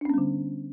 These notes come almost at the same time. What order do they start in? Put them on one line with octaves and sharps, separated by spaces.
D4 C#4 B3 G3 D3